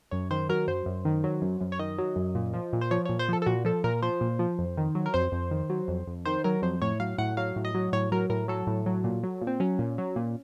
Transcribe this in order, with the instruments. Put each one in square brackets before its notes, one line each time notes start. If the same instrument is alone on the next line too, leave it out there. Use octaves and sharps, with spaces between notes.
[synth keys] F#2 C#5
D#3 C5
F#3 A#4
F#2 C5
F#2
D#3
F#3
F#2
F#2
C#5
D#3 D#5
F#3
F#2
A#2
F3
A#2
C5
F3 C#5
A#2 C#5
C5
F3 A4
A4
A#2 F#4
F3 A4
A#2 A#4
F3 C5
A#2
F3
F2
D#3
F#3
A#4
F2 C5
F2
D#3
F#3
F2
F2
D#3 C5
F#3 A#4
F2 C5
A2 C#5
F#3 F5
A2 F#5
F#3 F5
A2
D#5
F#3
A2 C#5
F#3 A#4
A2 A#4
F#3 A4
A2
F#3
A#2
F#3
A#2
C4
F#3 C#4
A#2
F#3
A#2